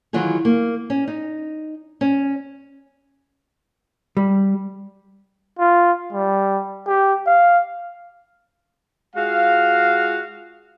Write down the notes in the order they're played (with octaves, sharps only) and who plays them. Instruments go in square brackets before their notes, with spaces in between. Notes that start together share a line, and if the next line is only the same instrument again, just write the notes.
[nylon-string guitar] D#3 E3 F#3 F4 F#4 G#4
A#3
C#4
D#4
C#4
[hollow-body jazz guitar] G3
[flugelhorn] F4
G3
G4
F5
[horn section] G#3 F4 F#4 F5